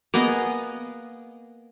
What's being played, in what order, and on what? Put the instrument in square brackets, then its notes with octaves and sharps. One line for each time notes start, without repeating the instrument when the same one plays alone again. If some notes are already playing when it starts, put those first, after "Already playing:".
[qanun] A#3 B3 G#4 D#5